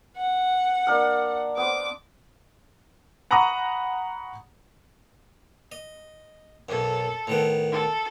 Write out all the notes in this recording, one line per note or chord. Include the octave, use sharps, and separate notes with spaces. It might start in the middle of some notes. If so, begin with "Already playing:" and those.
F#5
A#3 D4 F5
B3 C5 D6
F#5 A#5 B5 C#6 D#6
D#5
B1 F#2 A4
A2 D#3 B3
A4